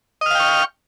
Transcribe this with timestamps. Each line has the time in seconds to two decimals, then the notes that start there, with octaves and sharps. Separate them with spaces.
0.21 D#5
0.26 F6
0.30 F5
0.35 G5
0.40 C#6